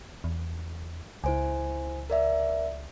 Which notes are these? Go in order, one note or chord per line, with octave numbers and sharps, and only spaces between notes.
E2
C#2 E4 C5 G#5
A#4 D5 E5